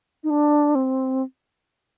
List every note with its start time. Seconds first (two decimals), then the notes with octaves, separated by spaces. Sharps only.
0.24 D#4
0.30 D4
0.75 C4